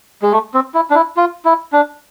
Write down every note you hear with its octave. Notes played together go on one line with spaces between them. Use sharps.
G#3
A3
C4
E4
D4
E4
F4
E4
D4